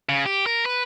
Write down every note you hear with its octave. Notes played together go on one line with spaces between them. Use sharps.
C#3
G4
A#4
B4